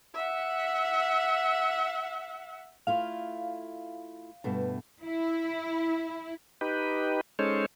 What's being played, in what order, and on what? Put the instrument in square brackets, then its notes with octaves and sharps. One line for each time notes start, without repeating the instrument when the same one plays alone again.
[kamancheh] E5 F#5
[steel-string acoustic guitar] A3 E4 F4 [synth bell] F5
[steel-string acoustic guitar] G2 B2 A3
[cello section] E4
[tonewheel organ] D#4 G4 B4
G#3 C#4 D#4 A4 C5 C#5